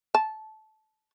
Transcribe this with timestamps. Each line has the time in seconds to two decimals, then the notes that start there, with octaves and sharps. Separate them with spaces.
0.15 A5